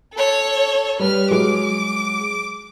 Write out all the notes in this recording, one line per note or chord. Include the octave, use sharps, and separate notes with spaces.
A4 C#5
G3 B4 F6
F#3 G#3 D6